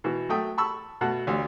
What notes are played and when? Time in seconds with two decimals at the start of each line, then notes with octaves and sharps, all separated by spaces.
0.04 B2 E3
0.29 F#3 A3 G5 D#6
0.58 A5 B5 C#6 E6
1.01 B2 A3 F#5 A5
1.27 A1 D2